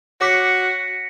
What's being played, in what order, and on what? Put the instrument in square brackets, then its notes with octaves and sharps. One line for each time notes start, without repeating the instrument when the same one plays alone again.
[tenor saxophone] F#4 [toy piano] C#5 D6 [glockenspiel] A#6 B6 C#7